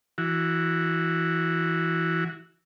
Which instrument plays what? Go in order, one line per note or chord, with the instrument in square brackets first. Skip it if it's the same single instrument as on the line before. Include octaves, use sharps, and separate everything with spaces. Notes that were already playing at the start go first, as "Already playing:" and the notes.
[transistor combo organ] E3 F#4